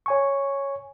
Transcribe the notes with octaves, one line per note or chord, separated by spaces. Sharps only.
C#5 G#5 C#6